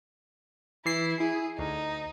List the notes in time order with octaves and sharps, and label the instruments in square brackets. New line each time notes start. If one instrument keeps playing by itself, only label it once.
[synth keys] E3 C7 [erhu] E4
[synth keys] E4 [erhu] G#4
[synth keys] D2 [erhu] D#4